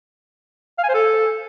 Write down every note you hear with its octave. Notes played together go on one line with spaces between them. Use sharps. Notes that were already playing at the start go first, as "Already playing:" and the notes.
F5
G#5
C5
A4